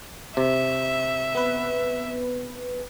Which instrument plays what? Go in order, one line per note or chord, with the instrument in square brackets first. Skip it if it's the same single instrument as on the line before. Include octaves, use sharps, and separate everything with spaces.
[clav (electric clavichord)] C3 [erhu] E5
[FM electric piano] B3 B4